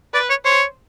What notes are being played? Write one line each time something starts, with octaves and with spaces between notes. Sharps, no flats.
B4 D5
C#5
C5 C#5